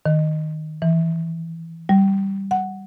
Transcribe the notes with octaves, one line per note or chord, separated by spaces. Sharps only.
D#3
E3
G3
F#5